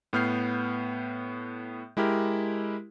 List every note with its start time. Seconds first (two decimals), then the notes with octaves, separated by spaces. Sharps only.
0.13 A2 B3 F6 G6 C7
1.97 G#3 E4 G4 A#4